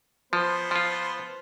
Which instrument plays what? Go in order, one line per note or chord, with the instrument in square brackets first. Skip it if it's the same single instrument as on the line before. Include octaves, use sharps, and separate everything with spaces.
[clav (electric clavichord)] F3 [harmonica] B3 C5
[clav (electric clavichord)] F3 F4